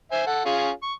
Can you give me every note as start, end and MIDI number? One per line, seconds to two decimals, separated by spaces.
0.12 0.23 72
0.12 0.23 76
0.12 0.23 80
0.27 0.43 69
0.27 0.43 78
0.45 0.70 61
0.45 0.70 65
0.45 0.70 68
0.83 0.93 85